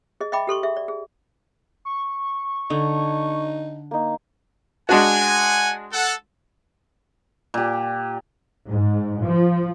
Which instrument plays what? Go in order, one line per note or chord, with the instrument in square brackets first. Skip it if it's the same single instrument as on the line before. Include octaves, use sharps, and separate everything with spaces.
[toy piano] G#4 D#5
D#5 E5 G5 B5 D6
G4 A4 C6 C#6
G#4 E5
D5
G#4
[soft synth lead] C#6
[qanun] D3 [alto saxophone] D#4
[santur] A#3 D#4
[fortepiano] G#3 D4 F#4 [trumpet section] F#5 G#5
[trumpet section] A4 F#5
[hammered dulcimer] A#2 G4
[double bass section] G#2
F3